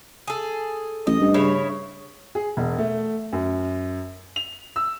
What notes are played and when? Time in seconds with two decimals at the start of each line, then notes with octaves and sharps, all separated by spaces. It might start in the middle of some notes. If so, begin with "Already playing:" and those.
0.27 G#4 A4
1.07 A1 D#5
1.21 G2
1.34 C#3 E4 C#5
2.35 G#4
2.57 E1
2.78 A3
3.33 F#2
4.36 F7
4.76 E6